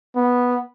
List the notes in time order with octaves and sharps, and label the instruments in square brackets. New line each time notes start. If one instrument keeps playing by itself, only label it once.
[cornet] B3